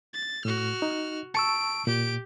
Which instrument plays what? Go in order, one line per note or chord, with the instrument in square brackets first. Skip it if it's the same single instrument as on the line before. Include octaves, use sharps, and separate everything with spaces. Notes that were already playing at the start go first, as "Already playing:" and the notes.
[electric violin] A6
[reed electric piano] A2 [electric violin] F#4 F6
[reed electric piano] D#4
[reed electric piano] A5 C#6 E6 [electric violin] D7
[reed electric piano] A#2 [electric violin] G4 D7